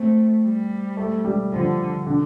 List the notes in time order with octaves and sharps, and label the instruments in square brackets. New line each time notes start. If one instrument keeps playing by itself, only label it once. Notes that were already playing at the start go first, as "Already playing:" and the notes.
Already playing: [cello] A3 [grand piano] C4
[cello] G3
[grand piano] A3
G3
[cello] D3 [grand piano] F3
[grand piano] D3